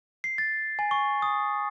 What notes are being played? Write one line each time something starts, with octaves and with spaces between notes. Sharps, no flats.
C7
A6
G#5
C#6
D#6